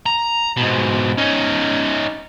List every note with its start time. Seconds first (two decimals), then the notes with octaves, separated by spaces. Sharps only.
0.06 A#5
0.57 G#2 B2
1.18 C#4 D#4